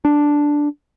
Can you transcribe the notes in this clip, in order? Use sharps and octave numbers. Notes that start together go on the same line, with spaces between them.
D4